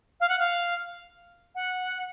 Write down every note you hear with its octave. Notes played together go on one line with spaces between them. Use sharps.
F5
F#5
F5
F#5